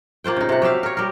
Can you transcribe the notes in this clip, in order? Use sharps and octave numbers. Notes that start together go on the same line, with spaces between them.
A#3 F4 C5 G5
C#3 D#4
C3 F#5
F#3 G4 E5 F5
A#4 C#5
G3 A#4